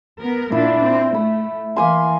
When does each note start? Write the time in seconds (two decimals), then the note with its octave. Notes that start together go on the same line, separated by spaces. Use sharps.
0.19 B3 A#4
0.52 A#2 A#3 D4 E4
0.82 C4
1.14 A3 B5
1.76 E3 A#3 G#5 C6